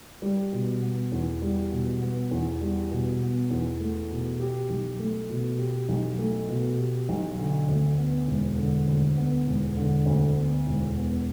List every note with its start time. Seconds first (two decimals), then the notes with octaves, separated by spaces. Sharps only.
0.22 G3
0.52 B2
0.82 B3
1.12 E2
1.42 G3
1.71 B2
2.02 B3
2.31 E2
2.61 G3
2.91 B2
3.21 B3
3.50 E2
3.80 A3
4.11 B2
4.40 G4
4.70 B1
4.99 A3
5.30 B2
5.59 G4
5.89 B1
6.18 A3
6.49 B2
6.78 G4
7.09 B1
7.38 D3
7.68 D2
7.98 B3
8.28 E1
8.57 D3
8.87 D2
9.17 B3
9.47 E1
9.77 D3
10.06 D2
10.36 B3
10.67 E1
10.96 B3